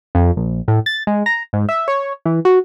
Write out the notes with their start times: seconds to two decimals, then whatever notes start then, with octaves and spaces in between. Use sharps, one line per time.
0.15 F2
0.36 A#1
0.68 A2
0.86 A6
1.07 G#3
1.26 A#5
1.53 G#2
1.69 E5
1.88 C#5
2.26 E3
2.45 F#4